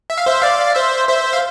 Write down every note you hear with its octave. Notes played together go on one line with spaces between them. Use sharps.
E5
F5
C5 E5
D5 F5
C5 E5
C5 E5
F5